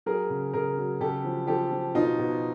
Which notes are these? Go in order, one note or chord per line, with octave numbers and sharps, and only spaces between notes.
F#3 G#4 A#4
C#3
C#3 G#4 A#4
F#3
C#3 G4 A4
F3
F3 G4 A4
F3
B2 D#4 F4
B2